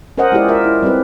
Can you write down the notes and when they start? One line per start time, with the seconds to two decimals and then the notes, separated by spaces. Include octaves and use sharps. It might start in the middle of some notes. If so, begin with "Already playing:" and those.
0.18 C#4 A#4 C5 D#5 F#5
0.32 G#3 E4 F4 G4 G#4 D5
0.48 F4 A#4 E5
0.64 E4
0.83 G3 C4 F4 G4 B4